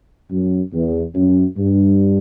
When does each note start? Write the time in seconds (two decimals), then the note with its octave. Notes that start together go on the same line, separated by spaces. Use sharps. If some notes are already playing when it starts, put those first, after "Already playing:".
0.31 F#2
0.74 E2
1.15 F#2
1.57 G2